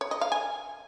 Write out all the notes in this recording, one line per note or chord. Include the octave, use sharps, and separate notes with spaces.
C#5
D#5
F5
G#5